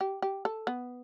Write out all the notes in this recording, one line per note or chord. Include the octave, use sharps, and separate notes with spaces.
G4
G4
A4
B3